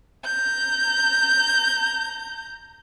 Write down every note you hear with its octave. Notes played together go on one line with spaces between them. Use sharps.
A#5 G6